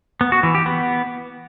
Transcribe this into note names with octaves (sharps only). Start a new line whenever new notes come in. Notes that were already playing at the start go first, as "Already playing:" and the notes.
B3
F#4
E3
G4
B3